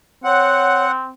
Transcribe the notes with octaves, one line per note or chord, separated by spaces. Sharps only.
C4 C#5 F#5